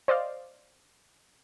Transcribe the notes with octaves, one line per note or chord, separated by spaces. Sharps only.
C5 D5 D#5 F5